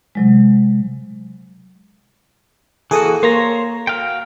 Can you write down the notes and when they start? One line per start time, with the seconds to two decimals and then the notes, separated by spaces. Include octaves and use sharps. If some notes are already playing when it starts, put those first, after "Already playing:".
0.15 C3 F#3 G#3
2.91 E3 A#3 F#4 G#4 A4 D#6
3.23 A#3 C5 C#5 A#5
3.87 F#4 F5 G5